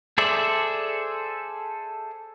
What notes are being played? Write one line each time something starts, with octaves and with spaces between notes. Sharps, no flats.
G#4 A4 C5 D5 E5